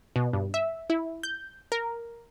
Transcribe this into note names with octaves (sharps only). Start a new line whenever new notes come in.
B2
G2
E5
E4
G6
A#4